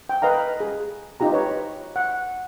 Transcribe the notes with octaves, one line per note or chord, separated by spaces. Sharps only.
G5
B4 D#5 F5 A#5
G#4
D#4 F4 G4 A#5
B4 C#5
F#5